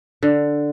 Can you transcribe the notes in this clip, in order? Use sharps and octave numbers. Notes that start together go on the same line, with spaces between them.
D3